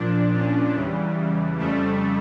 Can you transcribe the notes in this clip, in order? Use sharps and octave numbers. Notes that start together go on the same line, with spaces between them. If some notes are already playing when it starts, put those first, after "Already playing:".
Already playing: A#2 F3 D4
C#4
E2 C#3 E3 G3
F2 C#3 G3 A3